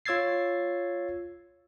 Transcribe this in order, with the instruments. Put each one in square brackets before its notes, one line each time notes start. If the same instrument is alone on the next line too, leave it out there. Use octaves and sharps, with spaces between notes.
[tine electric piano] F4 C#5 E6 G#6 A6 C7